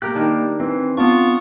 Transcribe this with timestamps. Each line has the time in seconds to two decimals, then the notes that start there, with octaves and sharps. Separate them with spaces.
0.02 A#3 G4 A#4 F#6
0.15 D#3 G3 D4
0.60 E3 C4
0.97 B3 D4 F4 C#6